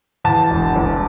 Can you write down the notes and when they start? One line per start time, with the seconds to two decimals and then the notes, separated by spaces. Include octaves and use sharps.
0.24 E2 A5
0.51 E1
0.76 C2